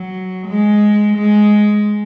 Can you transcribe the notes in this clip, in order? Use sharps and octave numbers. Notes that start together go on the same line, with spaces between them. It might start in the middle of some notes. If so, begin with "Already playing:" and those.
Already playing: F#3
G#3
G#3